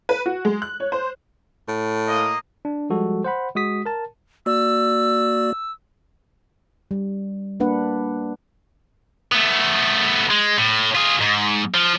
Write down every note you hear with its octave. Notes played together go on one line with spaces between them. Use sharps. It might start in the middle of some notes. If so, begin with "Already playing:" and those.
B4
F#4
G#3
F#6
C#5
C5
A2
A#3 D#5
D4
F3 G3 G#3 F#4 A4
C5 F#5 B5
G#3 F#4 D#6 B6
A#4 A5
A#3 F#4 D5 E6
G3
A#3 D4 B4 F#5
A3 B3
G#3
A2
F4 G#4
G#2
F3